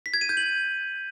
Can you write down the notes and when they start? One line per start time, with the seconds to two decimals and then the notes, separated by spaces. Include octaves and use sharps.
0.06 B6
0.14 G#6
0.21 D#7
0.29 G6
0.37 F#7